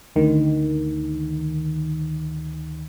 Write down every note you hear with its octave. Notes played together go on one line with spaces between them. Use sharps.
D2 D#3